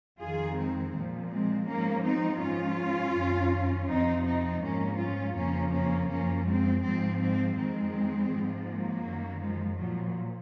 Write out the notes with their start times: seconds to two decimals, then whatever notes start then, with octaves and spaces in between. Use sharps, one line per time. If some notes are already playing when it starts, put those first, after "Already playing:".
0.20 F2 D#3 F4 G#4
0.57 G#3 C4
0.94 A#2 F3
1.30 G#3 C4
1.67 G#2 F3 A#3 C#4
2.04 C4 D#4
2.41 G#2 F3 C#4 F4
3.15 F#2 D#3
3.88 F2 C3 F3 C4 D#4
4.25 C4 D#4
4.62 G#2 F3 A#3 C#4
4.99 C#4 F4
5.36 F2 C#3 F3 A#3 C#4
5.73 A#3 C#4
6.10 F#2 F3 A#3 C#4
6.46 G#3 C4
6.83 G#2 F3 G#3 C4
7.20 G#3 C4
7.57 F2 D#3 G#3 C4
8.30 G#2 F3
8.68 F#3 A#3
9.04 F#2 D#3
9.41 F3 G#3
9.78 A#2 F3 F#3